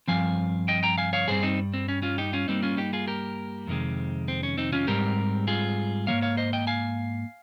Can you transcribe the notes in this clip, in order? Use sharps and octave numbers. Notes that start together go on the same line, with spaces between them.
G2 F3 C4 F5 G#5
D#5 G5
G5 A#5
F5 G#5
C#5 F5
G2 G3 C4 G#4 C5
C4 D#4
C4
C#4
C#4 F4
D#4 G4
C#4 F4
G2 G3 A#3 C4 D#4
C#4 F4
D#4 G4
F4 G#4
G4 A#4
F2 C3 D#3 G#3 C4
C4
C#4
C4 D#4
C#4 F4
G#2 G3 C4 G4 A#4
F4 G#4
F3 A#3 C#5 F5
G#2
C#5 F5
C5 D#5
D#5 G5
F5 G#5